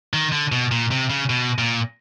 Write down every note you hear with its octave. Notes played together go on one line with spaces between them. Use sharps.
D#3
D3
B2
A#2
C3
C#3
B2
A#2